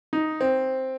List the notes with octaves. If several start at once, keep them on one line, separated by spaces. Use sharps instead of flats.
D#4
C4